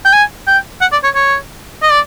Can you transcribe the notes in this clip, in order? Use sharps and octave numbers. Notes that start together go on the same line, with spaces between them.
G5
G#5
G5
F#5
D5
C#5
C#5
D#5
D5